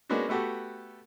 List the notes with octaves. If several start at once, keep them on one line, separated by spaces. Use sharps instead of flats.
G#3 A#3 B3 C#4 D4 F#4
A3 B3 F#4 G4 A4